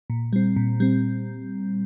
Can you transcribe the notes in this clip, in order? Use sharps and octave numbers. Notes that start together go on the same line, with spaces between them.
A#2
G3 C4
A#2
G3 C4